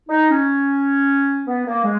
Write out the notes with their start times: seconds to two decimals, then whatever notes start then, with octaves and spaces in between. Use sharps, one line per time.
0.09 D#4
0.30 C#4
1.46 B3
1.66 A#3
1.84 G#3